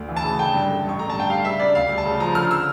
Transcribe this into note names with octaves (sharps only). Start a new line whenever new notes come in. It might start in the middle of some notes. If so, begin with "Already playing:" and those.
Already playing: D2
E3
A5
C#3
D3 G5
G2
A3
A1 C#6
D3 A#5
G2 A5
G5
G3 F5
C#3 E5
D4 D5
D2 F5
G3
A5
C#3
F3 A#5
D3 F6
E6